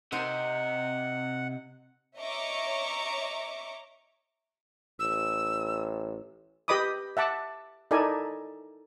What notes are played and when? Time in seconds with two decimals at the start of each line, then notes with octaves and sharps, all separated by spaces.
0.12 C3 D#4 C5 F#5
2.19 C#5 D#5 E5 A#5 C#6 D6
4.99 A1 E6
6.68 G4 B4 D#5 B5 D6 D#6
7.17 E5 F#5 A5 D6
7.91 D#4 E4 A4 A#4 D5 G#5